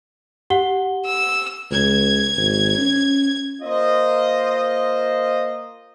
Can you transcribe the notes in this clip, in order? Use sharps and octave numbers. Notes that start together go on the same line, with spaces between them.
G4 F#5 G7
E6
C#2 G#6
G#1
C#4
A#3 F4 C5 D#5